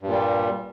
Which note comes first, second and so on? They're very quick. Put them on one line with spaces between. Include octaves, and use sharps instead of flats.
G2 A#2 G3